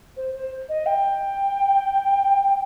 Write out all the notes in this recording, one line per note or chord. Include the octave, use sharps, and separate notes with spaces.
C5
C5
D#5
G5